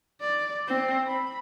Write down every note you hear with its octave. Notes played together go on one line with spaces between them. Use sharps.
D5
C4
B5